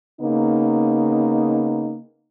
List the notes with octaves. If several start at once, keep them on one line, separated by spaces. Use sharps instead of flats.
C#3 A#3 B3 D#4